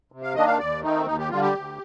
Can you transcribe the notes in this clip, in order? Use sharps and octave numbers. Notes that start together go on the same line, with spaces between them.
C3
F5
D#3 A#3 D4 D#5
F5
D#2 D5
D#3 A3 C4 D#4
D#2 D#4
G4
D3 G3 F4
G4
D2